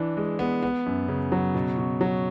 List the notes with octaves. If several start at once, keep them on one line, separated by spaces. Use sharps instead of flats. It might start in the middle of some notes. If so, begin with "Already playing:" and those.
Already playing: E3 D4
G#3
B3
B3
F#2
C#3
F#3
B2
B2
F#3